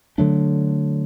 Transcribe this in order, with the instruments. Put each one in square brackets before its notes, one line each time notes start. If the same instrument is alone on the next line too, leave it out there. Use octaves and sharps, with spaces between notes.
[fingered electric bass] D3 F#3 A3 D4